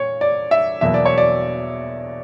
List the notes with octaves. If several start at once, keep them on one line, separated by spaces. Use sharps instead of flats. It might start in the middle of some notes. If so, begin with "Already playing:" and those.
Already playing: A#2 C#5
D5
E5
E2 B2 F#3 A#3 E5
D5
C#5
D5